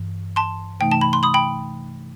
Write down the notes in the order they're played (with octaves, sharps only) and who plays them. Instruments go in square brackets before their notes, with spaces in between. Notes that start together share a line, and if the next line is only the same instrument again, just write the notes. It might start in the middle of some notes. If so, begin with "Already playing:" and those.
Already playing: [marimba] G2 E3
[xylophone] A5 C6
[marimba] C3 E3 A3 D#4 [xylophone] G5
[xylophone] A5
B5
C6
B5 D#6
G5 B5